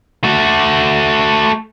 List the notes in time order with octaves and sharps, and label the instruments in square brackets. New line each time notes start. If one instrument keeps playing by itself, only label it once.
[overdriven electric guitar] A3 F#4